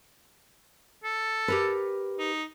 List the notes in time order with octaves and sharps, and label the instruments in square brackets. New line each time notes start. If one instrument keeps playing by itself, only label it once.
[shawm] A4
[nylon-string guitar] G4 A#4 B4
[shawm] D#4